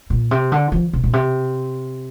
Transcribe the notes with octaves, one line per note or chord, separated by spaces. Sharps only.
A#2
C3
D3
F3
C3
A#2
C3